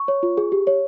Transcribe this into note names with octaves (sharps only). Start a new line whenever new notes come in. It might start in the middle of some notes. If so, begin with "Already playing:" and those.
Already playing: C#6
C#5
F4
G#4
G4
C#5